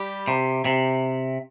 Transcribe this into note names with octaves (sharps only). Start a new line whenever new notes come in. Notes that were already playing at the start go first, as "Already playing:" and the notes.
Already playing: G3 G4
C3
C3